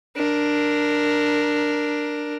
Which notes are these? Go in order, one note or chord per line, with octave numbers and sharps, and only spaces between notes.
D4 A#4